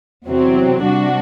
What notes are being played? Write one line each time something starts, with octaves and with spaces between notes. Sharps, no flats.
E2 C3 F#3 C4
C3 G3 D4 F#4